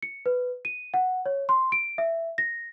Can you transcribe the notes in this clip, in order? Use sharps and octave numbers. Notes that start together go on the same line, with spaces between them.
C#7
B4
D#7
F#5
C#5
C6
D7
E5
A#6